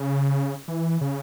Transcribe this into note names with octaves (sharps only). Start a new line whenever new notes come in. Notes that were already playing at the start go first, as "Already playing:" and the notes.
Already playing: C#3
E3
C#3